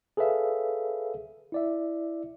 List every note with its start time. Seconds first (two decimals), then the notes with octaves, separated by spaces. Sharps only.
0.17 G#4 A4 B4 C#5 E5 F5
1.52 E4 D5 E5